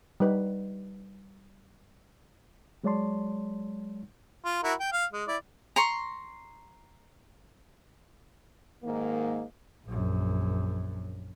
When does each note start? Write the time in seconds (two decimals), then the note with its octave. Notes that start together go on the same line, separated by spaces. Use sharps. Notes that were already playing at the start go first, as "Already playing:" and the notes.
0.20 G3 D#4 B4
2.84 F#3 G#3 C#5 D5 A5 C6
4.44 F4
4.63 E4 F#4 A#4
4.80 G5
4.92 F5
5.12 G#3
5.28 E4 D5
5.76 A#5 C6 C#6
8.84 G#2 D#3 A#3
9.87 A#1 F#2